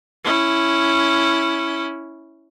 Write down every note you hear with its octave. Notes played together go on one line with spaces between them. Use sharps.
C#4 E4